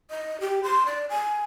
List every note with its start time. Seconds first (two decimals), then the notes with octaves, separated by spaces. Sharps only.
0.10 D#5
0.40 G4
0.63 C6
0.86 D5
1.10 G#5